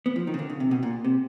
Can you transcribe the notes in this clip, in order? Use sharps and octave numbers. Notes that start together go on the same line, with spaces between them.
B3
F3
D#3
C#3
D3
C#3
C3
B2
A#2
C3